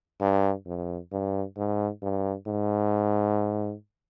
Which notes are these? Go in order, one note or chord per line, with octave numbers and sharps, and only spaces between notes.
G2
F2
G2
G#2
G2
G#2